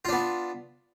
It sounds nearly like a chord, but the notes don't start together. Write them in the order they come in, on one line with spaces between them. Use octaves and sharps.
F4 D4 B3